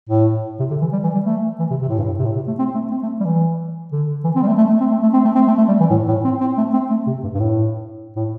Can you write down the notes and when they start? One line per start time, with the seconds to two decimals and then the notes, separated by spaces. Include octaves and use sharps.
0.09 A2
0.59 C3
0.70 D3
0.82 E3
0.93 G3
1.03 E3
1.14 G3
1.25 A3
1.59 E3
1.71 C3
1.81 C3
1.89 A2
1.98 G2
2.05 A2
2.18 C3
2.25 A2
2.36 C3
2.47 A3
2.59 C4
2.75 A3
2.91 C4
3.03 A3
3.20 G3
3.25 E3
3.92 D3
4.24 E3
4.36 C4
4.42 G3
4.47 A3
4.58 A3
4.69 A3
4.80 C4
4.91 A3
5.03 A3
5.13 C4
5.25 A3
5.35 C4
5.47 A3
5.58 A3
5.68 G3
5.80 E3
5.90 A2
6.08 A2
6.25 C4
6.41 C4
6.58 A3
6.74 C4
6.90 A3
7.07 C3
7.24 G2
7.34 G2
7.40 A2
8.16 A2